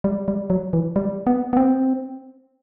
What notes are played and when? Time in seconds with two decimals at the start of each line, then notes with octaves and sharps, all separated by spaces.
0.04 G3
0.28 G3
0.50 F#3
0.73 E3
0.96 G3
1.27 B3
1.53 B3
1.57 C4